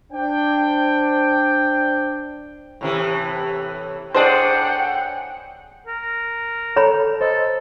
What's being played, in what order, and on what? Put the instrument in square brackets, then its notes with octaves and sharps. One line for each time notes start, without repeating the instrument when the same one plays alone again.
[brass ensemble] D4 C5 G5
[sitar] A2 C3 E3
[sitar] A2 G#4 D5 [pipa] D4 C5 [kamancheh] F#5 G5
[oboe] A#4
[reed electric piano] A4 [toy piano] C#5 A#5 B5
[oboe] A4 [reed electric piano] C5 D#5